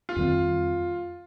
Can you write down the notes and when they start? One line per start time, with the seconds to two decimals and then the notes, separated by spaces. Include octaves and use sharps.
0.09 F4
0.16 F2 D#3 G3 C4